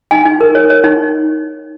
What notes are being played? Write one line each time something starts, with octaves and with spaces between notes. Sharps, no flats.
D#4 G#5
D#4
A#4
C#5
C#5
D#4